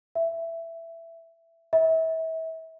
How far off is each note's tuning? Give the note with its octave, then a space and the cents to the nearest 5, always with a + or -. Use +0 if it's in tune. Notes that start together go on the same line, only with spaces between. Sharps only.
E5 +10
E5 -35